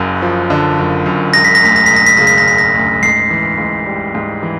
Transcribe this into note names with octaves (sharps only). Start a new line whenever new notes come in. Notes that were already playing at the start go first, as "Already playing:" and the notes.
Already playing: F#1 F#2
F3
D3
F#1
F#2
E1 A#6
B6
A#6
D2 B6
A#6
E1 B6
A#6
B6
C#3 A#6
B6
A#6
E1 B6
A#6
D2
G#2 C7
E3
G#2
G3
G#2
E3